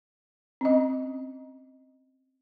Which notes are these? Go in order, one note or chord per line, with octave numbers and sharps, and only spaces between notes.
C4 C#4 D#5